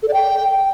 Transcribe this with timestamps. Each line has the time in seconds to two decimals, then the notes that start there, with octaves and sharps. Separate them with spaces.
0.03 A4
0.08 D5
0.14 G5